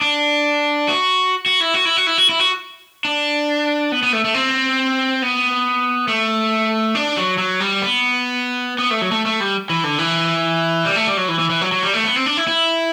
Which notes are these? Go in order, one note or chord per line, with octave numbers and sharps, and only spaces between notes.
D4
F#4
F#4
E4
F#4
E4
F#4
E4
F#4
E4
F#4
D4
B3
B3
A3
A3
C4
B3
A3
D4
F#3
F#3
G3
B3
B3
A3
F#3
A3
A3
G3
E3
D3
E3
G3
A3
G3
F#3
E3
E3
E3
F#3
F#3
G3
A3
B3
C4
D4
E4
E4